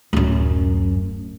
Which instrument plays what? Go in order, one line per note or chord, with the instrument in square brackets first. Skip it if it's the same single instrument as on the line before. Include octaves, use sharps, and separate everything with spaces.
[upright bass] D1 F#2